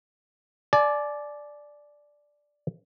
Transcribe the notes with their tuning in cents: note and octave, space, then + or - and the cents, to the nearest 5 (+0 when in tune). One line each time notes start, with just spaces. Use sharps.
D5 +0 G#5 +45